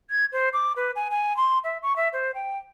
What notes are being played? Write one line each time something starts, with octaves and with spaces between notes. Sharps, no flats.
G#6
C5
D6
B4
G#5
G#5
C6
E5
C#6
E5
C5
G5